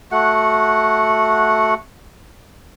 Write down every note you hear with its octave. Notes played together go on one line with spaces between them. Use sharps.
A3 F#4 F#5